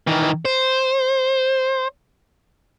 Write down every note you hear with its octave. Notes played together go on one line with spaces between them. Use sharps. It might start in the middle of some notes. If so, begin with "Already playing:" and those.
D#3 E3
C5